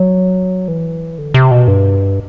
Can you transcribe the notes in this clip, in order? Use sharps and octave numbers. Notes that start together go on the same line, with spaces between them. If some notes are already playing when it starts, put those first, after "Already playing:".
Already playing: F#3
E3
D3
C3
B2
G2